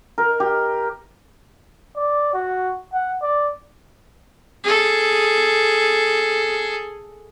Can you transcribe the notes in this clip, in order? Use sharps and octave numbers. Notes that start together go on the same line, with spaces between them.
A#4
G4
D5
F#4
F#5
D5
G#4 A4